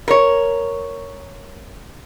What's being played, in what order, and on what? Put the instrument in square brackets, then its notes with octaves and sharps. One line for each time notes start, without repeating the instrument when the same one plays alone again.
[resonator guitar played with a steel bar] A#4 C#5